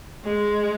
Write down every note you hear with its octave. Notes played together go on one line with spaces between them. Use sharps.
G#3